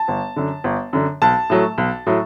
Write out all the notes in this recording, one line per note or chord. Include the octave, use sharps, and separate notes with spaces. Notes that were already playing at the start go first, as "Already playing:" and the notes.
Already playing: A5
G1
F#2 D3
G1
F#2 D3
B1 A5
A2 F#3 A3
B1
A2 F#3 A3